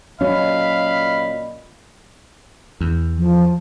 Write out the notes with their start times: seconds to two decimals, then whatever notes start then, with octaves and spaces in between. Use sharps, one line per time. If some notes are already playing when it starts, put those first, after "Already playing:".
0.21 A#2 F#3 C#4 D#5 F5 B5
2.81 E2
3.17 F3